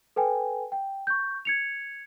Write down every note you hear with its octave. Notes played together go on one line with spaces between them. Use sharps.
A4 B4 G5 G#5
G5
C#6 G6
G#6 C#7 F7